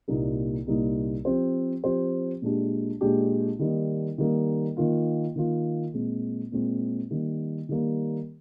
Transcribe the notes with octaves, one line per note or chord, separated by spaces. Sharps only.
C2 A#2 G3 A#3 D#4
C2 A#2 G3 A#3 D#4
F3 C4 G4 C5
F3 C4 G4 C5
A#2 G#3 D4 G4
A#2 G#3 D4 G4
D#3 G3 A#3 D#4
D#3 G3 A#3 D#4
D#3 A#3 F4
D#3 A#3 F4
A#2 G#3 C4
A#2 G#3 C4
D#3 G3 A#3
D#3 G3 A#3